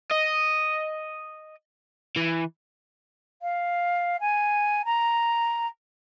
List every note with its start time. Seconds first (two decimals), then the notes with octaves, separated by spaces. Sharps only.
0.11 D#5
2.16 E3
3.42 F5
4.21 G#5
4.85 A#5